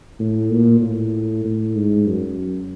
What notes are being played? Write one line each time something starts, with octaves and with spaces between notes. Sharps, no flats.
A2
A#2
A2
A2
G#2
F#2